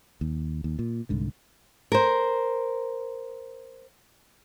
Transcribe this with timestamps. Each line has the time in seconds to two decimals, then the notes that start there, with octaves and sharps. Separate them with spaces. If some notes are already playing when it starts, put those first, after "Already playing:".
0.21 D#2
0.64 D#2
0.79 A#2
1.09 C2 G#2 D3
1.92 A#4 C5